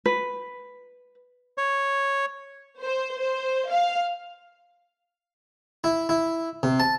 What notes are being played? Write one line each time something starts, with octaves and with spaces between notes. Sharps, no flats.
B4
C#5
C5
C5
F5
E4
E4
C3
A5